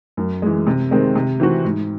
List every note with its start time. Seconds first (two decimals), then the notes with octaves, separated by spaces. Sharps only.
0.17 F#2
0.42 E3 G#3
0.67 C3
0.91 D#3 G#3 C4
1.15 C3
1.40 E3 C4 F#4
1.64 G#2